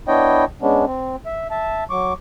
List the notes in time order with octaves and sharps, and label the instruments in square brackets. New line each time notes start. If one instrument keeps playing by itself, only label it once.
[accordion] B3 D4 E4 C#5 D#5 G5
G#3 B3 C#4 D4
C4
E5
E5 A5
F#3 C#6 D6